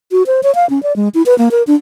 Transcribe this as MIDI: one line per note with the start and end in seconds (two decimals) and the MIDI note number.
0.12 0.23 66
0.27 0.41 72
0.43 0.54 73
0.55 0.68 77
0.70 0.82 61
0.83 0.95 74
0.96 1.09 56
1.14 1.22 64
1.26 1.37 71
1.38 1.49 58
1.51 1.63 70
1.67 1.75 62